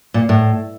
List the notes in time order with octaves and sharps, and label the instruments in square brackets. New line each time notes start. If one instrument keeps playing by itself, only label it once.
[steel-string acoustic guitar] A#2
A2